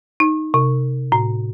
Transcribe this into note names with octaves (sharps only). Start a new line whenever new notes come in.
D#4
C3
A2